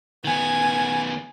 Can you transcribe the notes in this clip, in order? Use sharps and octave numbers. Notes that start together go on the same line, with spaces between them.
D#3 B3 G#5